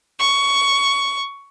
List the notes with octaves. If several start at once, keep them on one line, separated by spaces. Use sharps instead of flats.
C#6